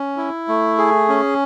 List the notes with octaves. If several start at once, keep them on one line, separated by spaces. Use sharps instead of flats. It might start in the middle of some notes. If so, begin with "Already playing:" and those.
Already playing: C#4
E4
A3
G#4
C#4